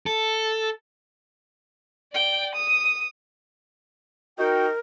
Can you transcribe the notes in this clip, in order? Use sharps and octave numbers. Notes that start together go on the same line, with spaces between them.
A4
D5 G5
D#6
D#4 F#4 A#4 G5